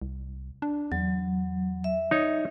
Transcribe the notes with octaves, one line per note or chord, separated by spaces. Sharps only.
C2
D4
E2 F#3
E5
D#4 C#5